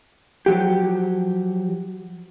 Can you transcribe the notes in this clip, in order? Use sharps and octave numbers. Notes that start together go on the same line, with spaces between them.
F3 F#3 G4